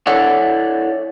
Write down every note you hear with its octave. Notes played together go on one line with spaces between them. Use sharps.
E4 A4 C#5 D5 E5 F#5